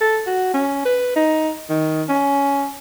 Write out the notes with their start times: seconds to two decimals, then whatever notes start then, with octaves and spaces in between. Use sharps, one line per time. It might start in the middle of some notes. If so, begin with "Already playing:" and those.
0.01 A4
0.27 F#4
0.54 C#4
0.85 B4
1.16 D#4
1.69 D#3
2.09 C#4